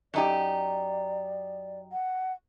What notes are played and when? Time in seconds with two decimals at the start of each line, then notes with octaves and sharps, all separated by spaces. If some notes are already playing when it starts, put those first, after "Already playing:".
0.14 F#2 D#4 G4 D5
1.92 F#5